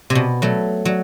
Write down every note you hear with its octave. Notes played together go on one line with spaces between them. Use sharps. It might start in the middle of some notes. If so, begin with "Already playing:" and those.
C3
B2
F#3 A3
F#3